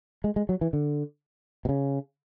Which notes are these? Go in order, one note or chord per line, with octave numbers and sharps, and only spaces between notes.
G#3
G#3
F#3
E3
D3
B2
C#3